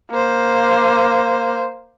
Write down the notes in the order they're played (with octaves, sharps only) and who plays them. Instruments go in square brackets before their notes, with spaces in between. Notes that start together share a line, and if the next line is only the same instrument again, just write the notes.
[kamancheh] A#3 C5